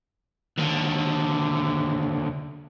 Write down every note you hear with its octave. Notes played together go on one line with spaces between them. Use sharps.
D#2 D3